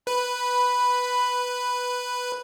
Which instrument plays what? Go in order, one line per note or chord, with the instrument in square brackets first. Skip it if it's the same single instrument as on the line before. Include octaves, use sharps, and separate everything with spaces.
[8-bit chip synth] B4 [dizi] B5